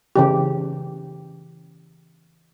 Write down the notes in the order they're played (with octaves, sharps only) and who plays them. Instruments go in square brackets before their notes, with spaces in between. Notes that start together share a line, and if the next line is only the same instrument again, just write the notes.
[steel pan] C#3 E3 G4